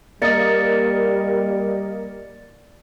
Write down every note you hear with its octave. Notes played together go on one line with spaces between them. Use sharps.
G3 A#3 A#4 D5 D#5 A6 C#7